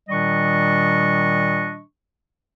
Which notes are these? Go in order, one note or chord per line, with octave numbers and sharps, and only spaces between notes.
A#2 D#3 G3 D4 D#5 C#6